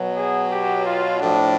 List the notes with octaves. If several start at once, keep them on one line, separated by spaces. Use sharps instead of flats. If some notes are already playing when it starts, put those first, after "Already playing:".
Already playing: B2 F#3
G#4
G4
F4
A2 F3 D4